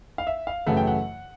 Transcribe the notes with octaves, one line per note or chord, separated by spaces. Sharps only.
F5
E5
F5
F#2 C#3 E3 A3 F#5
G5
F#5